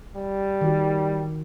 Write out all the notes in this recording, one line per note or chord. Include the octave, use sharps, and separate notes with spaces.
G3
D#3 F#4